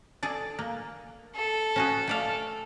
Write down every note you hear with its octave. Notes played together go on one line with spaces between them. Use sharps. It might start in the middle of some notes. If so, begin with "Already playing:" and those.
G#4 A4 D5
A#3
A4
C#4 F#4 G#4
A3 D5 F5